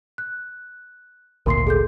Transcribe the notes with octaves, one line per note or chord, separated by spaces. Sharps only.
F#6
G#1 D2 A#2 A#4 C6 C7
G#4 A4 G6